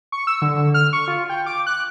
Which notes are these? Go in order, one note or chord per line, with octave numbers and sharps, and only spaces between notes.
C#6
E6
D3
F6
C#6
F4
G5
D6
F#6